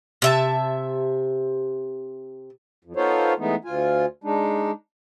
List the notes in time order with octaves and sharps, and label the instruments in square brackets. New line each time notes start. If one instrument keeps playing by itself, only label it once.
[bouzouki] C3 E5 A5
[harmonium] F2
B3 D#4 F4 A4 C5 C#5
E3 G#3 A3 B3 D#4
D2 F4 G#5
G#3 D4 D#4